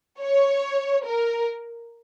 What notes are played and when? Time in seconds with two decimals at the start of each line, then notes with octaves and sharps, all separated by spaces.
0.21 C#5
1.05 A#4